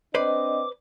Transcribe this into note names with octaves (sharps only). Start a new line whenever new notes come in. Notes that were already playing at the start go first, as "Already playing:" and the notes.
C4 D4 B4 C5 D5 D#5 D6